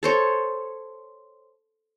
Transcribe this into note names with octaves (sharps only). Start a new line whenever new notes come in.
A4 C5 C#5